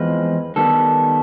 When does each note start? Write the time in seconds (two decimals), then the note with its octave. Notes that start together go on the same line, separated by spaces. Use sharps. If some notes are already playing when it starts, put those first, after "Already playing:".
Already playing: E2 F3 G#3 C4 B4
0.56 D#3 G3 B3 A4